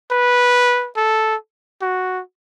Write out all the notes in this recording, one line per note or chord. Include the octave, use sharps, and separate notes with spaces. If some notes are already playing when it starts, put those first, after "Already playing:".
B4
A4
F#4